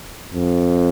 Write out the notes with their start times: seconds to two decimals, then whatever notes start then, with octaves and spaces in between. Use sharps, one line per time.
0.34 F2